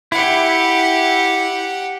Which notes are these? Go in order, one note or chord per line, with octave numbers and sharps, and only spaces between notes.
E4 G4 F#5